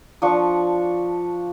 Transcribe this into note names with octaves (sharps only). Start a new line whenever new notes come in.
F3 D4 C#6